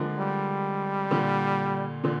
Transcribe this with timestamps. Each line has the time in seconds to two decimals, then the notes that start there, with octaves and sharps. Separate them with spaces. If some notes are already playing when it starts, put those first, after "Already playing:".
Already playing: D3 F3 G#3 A#3 C4 D4
0.19 G3
1.11 A#2 D3
2.04 A#2 D3